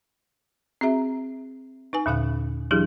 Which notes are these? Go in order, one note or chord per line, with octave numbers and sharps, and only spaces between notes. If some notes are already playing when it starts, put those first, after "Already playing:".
C4 F#4 G#4 E5 A#5
D#4 B4 G#5
D#2 A#2 D3 F5 F#6
E3 F#3 D4 E4 G4 G#4